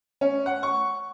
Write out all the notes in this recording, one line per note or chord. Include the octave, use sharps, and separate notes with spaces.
C#4
F#5
C#6